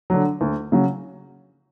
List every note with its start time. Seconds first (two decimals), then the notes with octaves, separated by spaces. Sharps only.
0.10 D3 F#3
0.41 D2
0.72 C#3 F#3